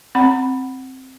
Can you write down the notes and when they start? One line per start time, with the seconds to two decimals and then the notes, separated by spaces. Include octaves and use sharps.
0.15 C4 F#5 B5